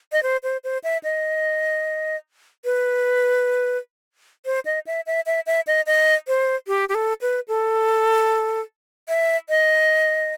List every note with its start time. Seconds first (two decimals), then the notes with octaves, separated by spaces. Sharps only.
0.12 D#5
0.23 C5
0.43 C5
0.64 C5
0.84 E5
1.03 D#5
2.65 B4
4.46 C5
4.65 D#5
4.86 E5
5.06 E5
5.26 E5
5.46 E5
5.67 D#5
5.86 D#5
6.28 C5
6.67 G4
6.89 G4
6.94 A4
7.21 B4
7.48 A4
9.08 E5
9.49 D#5